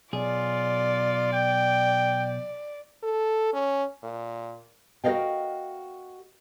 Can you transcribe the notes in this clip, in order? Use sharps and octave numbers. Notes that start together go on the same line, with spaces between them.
B1 F4 G#4 D5
G5
A4
C#4
A#2
F#4 A#4 D5 D#5 F5 G5